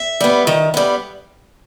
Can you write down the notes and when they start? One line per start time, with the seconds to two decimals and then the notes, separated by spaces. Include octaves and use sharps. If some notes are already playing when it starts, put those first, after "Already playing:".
Already playing: E5
0.20 G3 B3
0.47 D#3
0.74 G3 B3